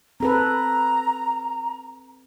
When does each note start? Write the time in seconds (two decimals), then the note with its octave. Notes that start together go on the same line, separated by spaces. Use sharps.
0.20 C4 A4 B4 A#5